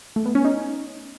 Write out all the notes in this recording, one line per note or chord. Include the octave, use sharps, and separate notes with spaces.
A3
B3
C#4
D#4